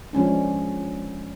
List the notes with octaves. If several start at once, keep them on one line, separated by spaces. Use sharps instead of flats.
F3 G#3 C#4 D4